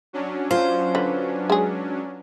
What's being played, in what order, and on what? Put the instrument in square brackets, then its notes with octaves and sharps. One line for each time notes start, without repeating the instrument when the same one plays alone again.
[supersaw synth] F#3 C#4 D4
[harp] F4 [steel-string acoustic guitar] C5
[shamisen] D3 [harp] B4
[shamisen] G#3 G#4